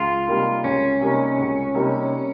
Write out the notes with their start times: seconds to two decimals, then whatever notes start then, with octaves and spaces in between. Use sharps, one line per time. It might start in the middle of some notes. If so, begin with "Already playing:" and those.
Already playing: C#2 F4
0.28 C3 G3 A#3 D#4
0.64 C#2 C#4
1.01 C3 G3 A#3 D#4
1.37 C#2
1.75 C3 G3 A#3 D#4